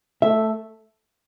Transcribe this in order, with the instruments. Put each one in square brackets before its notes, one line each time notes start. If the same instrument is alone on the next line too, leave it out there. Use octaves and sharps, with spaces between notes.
[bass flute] A3 [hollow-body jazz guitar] E5